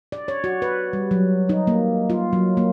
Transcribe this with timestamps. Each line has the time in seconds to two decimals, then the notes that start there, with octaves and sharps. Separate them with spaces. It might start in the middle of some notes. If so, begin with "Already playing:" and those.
0.12 D5
0.28 C#5
0.44 F#4
0.62 B4
0.93 G3
1.11 F#3
1.49 D#4
1.67 A#3
2.10 F4
2.33 F#3
2.57 A#3